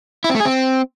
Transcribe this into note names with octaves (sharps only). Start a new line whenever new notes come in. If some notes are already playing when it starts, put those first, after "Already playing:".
E4
C4
A3
G#4
C4